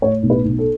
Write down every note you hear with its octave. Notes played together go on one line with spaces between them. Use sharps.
A2 C#5
B1
B4
B1
A4